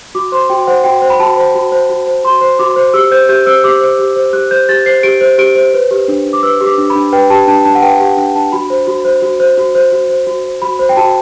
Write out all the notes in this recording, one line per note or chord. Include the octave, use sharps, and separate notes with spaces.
F#4 D6
C5 C6
F#4 G5
C5 F#5
F#4 G5
C5
B5
F#4 A5
C5
F#4
C5
F#4
C5
F#4 C6
C5
F#4 D6
C5
G4 E6
C5 G6
G4 G6
C5 E6
G4 D6
C5
G4
C5
G4 F#6
C5 G6
G4 A6
C5 C7
G4 D7
C5
G4 D7
C5
B4
G4
D4
D4
D6
B4 E6
G4
D6
D4
B5
D4
B4 G5
G4 A5
D4 A5
D4 A5
F#5
B4 G5
G4 F#5
D4 G5
D4 A5
F#4 B5
C5
F#4
C5
F#4
C5
F#4
C5
F#4
C5
F#4
C5
F#4 B5
C5
G5
F#4 A5